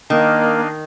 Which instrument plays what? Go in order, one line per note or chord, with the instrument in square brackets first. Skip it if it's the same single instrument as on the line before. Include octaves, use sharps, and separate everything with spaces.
[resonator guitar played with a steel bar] D#3 [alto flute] A#3 [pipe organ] D4 D#5 F5